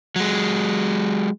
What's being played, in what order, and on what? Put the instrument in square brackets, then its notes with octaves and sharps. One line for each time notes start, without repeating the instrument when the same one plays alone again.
[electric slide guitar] F#3 G#3